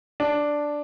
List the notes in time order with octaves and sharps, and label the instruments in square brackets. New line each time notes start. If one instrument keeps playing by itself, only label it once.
[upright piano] D4